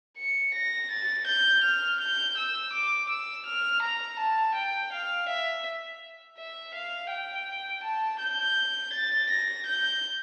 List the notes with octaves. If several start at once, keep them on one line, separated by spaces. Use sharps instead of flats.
C#7
A#6
A6
G6
F6
G6
E6
D6
E6
F6
A#5
A5
G5
F5
E5
E5
F5
G5
A5
G6
A6
A#6
G6